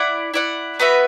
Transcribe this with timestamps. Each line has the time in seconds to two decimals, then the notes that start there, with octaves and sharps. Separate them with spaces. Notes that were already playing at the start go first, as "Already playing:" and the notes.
Already playing: E4 D5 F#5
0.34 E4 D5 F#5
0.80 B3 F#4 B4 E5